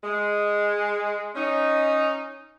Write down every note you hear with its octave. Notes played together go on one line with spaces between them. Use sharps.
G#3
C#4 D#4